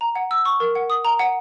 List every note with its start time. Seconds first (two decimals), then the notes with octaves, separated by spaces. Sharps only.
0.01 A#5
0.16 F#5
0.31 E6
0.45 C#6
0.60 A#4
0.75 F#5
0.90 D#6
1.05 A#5
1.19 F#5